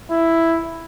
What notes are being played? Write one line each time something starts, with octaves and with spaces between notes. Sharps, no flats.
E4